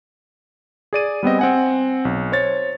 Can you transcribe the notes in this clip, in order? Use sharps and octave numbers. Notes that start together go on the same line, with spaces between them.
G#4 D5 D#7
G3 B3 C4 D#5
C4 F#5 G#5
B1
C5 C#5 A6